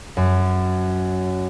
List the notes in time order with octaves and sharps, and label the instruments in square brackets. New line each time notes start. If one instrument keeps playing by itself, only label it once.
[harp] F#2